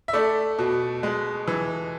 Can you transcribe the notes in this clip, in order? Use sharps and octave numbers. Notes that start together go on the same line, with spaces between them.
E5
A3 D5
B2
G#3
E3